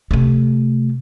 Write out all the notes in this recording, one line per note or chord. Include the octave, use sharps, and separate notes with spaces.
C3 A3